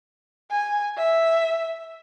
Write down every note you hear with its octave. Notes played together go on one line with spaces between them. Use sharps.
G#5
E5